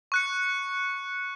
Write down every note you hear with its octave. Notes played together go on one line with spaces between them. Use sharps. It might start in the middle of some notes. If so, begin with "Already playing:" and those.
C#6 F#6 C#7